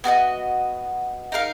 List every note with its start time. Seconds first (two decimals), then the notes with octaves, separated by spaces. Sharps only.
0.04 B3 F#4 A#4 D#5
1.32 D#4 A#4 F5